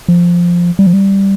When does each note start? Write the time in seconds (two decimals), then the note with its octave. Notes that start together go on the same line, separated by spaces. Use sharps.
0.08 F3
0.79 G3
0.87 F3
0.93 G3